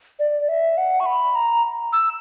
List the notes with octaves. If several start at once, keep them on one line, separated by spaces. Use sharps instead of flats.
D5
E5
F#5
C#6
B5
A#5
E6